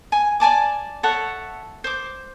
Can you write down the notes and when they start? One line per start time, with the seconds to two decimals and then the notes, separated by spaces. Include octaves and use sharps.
0.12 G#5
0.40 D5 G#5 A5 D6
1.03 A4 C#5 E5 F#5
1.84 C5 D6